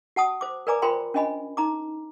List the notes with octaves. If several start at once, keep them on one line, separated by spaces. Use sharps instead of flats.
F#4 F#5 A5 D#6
C5 D6
A#4 B4 D5 G#5 A#5 D6
F4 A#4 C5 G5 B5 C6
C#4 D4 D#5 G#5 B5
D#4 A#5 D6